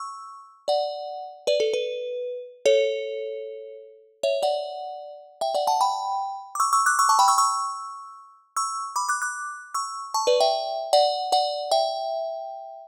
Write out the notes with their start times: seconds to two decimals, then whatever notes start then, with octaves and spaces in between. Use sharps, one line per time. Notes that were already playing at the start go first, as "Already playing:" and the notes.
Already playing: C#6 E6
0.68 D5 F#5
1.47 B4 D5
1.60 A4
1.73 B4
2.66 A4 C#5
4.23 C#5 E5
4.43 D5 F#5
5.41 E5 G5
5.54 D5 F#5
5.67 F#5 A5
5.81 G5 B5
6.55 D6
6.60 C#6 E6
6.73 C#6 E6
6.86 D6 F#6
6.99 C#6 E6
7.09 A5 C#6
7.19 G5 B5
7.28 C#6 E6
7.38 C#6 E6
8.57 C#6 E6
8.96 B5 D6
9.09 D6 F#6
9.22 D6 F#6
9.74 C#6 E6
10.14 A5 C#6
10.27 B4 D5
10.40 E5 G5
10.93 D5 F#5
11.32 D5 F#5
11.71 E5 G5